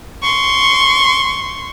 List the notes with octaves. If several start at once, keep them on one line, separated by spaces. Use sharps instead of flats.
C6 C#6